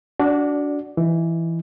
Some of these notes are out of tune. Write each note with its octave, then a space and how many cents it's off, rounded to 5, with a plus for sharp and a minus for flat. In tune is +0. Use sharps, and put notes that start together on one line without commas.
D4 -20 F#4 +5 D5 +0
E3 +10 D#4 +0